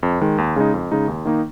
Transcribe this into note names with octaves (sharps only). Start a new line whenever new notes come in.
F2
D#3 G#3
D#2
C#3 G#3 D#4
F2
C#3 G#3 D#4
D#2
D#3 A#3 D#4